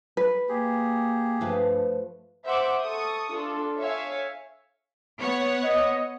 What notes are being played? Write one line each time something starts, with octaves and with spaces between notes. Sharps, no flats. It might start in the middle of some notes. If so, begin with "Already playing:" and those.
B4
A#3 G4 G#4
G2 F3 A3 B4
C5 E5 F#5 C6 D6
A4 C#6 D#6
D4 F4 A4
C#5 E5 F5 G#5
B3 C#5 F#5
D#5